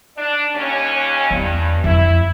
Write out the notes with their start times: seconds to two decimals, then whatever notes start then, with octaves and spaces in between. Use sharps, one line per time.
0.17 D4
0.55 D#2 C#4
1.31 E2 G2
1.84 F2 E4